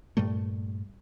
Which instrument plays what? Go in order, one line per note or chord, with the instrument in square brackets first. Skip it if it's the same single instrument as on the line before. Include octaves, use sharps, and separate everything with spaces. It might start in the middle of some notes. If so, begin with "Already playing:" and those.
[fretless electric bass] G2 A#2 G3 A3